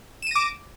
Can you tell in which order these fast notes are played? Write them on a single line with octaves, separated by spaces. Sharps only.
E7 D#7 A#6 D6